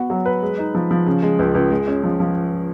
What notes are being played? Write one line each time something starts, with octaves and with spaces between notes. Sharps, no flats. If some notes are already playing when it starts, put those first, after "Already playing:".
Already playing: B3 F#4
F#3
B4
G#3
D#4
F3
F3
C#3
G#3
C#2
C#2
G#3
C#4
F3
F3